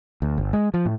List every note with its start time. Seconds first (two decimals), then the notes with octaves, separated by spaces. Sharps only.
0.22 D2
0.38 G1
0.53 G#3
0.74 F3
0.86 A2